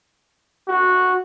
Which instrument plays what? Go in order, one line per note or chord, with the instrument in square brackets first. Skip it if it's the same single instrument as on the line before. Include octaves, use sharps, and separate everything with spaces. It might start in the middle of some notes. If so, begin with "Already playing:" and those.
[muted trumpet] F#4